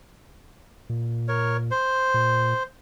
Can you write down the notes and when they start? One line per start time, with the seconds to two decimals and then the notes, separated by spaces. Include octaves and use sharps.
0.90 A#2
1.28 A#4 C#5
1.71 C5
2.14 A#2